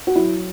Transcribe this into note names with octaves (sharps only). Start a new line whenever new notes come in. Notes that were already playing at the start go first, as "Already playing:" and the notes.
F#4
F#3 E4